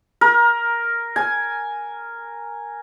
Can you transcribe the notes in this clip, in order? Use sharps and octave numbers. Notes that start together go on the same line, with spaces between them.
A#4
G#5